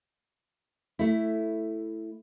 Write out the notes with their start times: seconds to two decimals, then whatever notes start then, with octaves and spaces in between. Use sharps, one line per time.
0.99 A3 E4